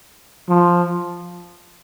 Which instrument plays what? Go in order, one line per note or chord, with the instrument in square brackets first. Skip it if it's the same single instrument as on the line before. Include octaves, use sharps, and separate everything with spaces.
[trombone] F3